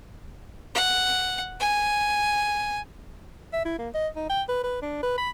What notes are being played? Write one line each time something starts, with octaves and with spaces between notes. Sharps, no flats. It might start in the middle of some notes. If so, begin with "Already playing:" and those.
F#5
G#5
E5
E4
A#3
D#5
D#4
G5
B4
B4
D4
B4
B5